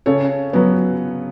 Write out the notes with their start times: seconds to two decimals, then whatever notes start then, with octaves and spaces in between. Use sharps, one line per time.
0.06 C#3 A4 C#5
0.53 F#3 B3